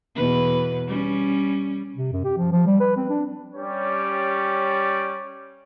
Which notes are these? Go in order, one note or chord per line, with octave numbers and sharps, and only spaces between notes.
E2 B2 B4
G3 C#4
C3
F#2
G4
F3
F3
G3
B4
C4
D4
G3 C#4 G4 C#5 D5